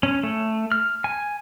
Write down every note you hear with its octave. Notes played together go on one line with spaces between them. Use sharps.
C#4
A3
F6
G#5